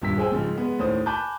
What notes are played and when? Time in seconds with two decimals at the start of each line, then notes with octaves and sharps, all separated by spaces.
0.02 D#1 G2 E6 B6
0.18 G#4 C5 G5 G#5 E6
0.32 G#2 C#3 F3
0.55 G#3 B3
0.79 D#2 A2 C#4 C5 D#6
1.06 G#5 A5 B5 D6 F#6 G6